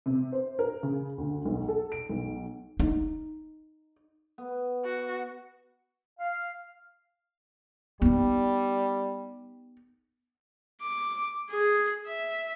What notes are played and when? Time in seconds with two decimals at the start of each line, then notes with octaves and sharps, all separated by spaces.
0.06 C3
0.32 C5
0.59 A#4
0.83 C#3
1.18 D2
1.45 B1
1.68 A4
1.92 D7
2.09 B1
2.79 D#4
4.38 B3
4.85 F#4
6.19 F5
8.02 G3 B3 D#4
10.82 D6
11.51 G#4
12.07 E5